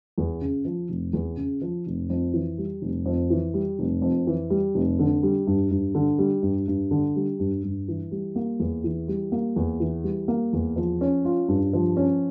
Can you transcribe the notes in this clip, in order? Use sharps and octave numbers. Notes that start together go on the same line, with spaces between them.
E2
C#3
F3
F1
E2
C#3
F3
F1
F2
E3
G3
F1
F2
E3
G3
F1
F2
E3
G3
F1
D3
G3
G2
G2
D3
G3
G2
G2
D3
G3
G2
G2
E3
G3
A#3
E2
E3
G3
A#3
E2
E3
G3
A#3
E2
F3
C#4
F4
G2
F3
C#4